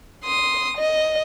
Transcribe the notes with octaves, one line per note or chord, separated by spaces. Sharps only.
C6 D#6
D#5